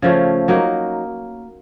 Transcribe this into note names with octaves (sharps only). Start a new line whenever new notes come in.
C#3 F3 A3 C#4
F#3 A#3 D#4